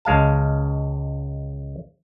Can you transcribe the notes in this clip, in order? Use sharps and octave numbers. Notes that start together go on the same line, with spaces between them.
C#2 G#3 F5 A5